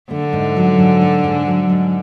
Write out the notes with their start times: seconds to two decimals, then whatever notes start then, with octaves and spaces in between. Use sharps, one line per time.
0.11 D3 A3
0.33 G#2
0.56 F#3
0.79 G#2
1.01 A3
1.24 G#2
1.47 F#3
1.69 G#2